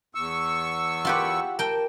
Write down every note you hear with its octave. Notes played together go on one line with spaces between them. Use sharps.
E2 C#6 E6
F4 G4 B4 F#5
A#4 G5 A5